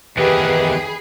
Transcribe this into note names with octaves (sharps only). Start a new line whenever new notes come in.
E2 D#3 G4 G#4 B4 B5 C7